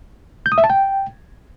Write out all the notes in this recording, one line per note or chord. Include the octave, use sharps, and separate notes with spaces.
G6
D#6
E5
A5
G5